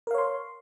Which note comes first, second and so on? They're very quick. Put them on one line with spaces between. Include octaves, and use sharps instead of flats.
A#4 F5 C#5 C6